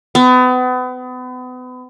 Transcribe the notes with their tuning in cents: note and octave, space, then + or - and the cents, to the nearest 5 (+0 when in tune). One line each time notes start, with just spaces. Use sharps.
B3 +35